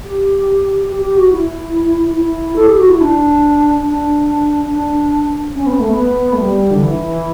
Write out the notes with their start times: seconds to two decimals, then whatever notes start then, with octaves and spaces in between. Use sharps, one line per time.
0.04 G4
0.88 G4
1.02 G4
1.17 F#4
1.31 E4
2.16 E4
2.56 A4
2.67 G4
2.78 F#4
2.89 E4
3.01 D4
3.85 D4
4.70 D4
5.55 C#4
5.67 B3
5.79 A3
5.92 B3
6.33 A3
6.39 G3
6.71 D3
6.82 E3